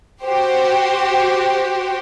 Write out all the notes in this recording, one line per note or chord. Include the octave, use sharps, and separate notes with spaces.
F#4 G4 C5